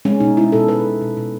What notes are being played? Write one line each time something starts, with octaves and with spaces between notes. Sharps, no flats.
G#3 C#4
B2 D#4
G#3 E4
B2 A4
G#3 B4
B2
B2
B2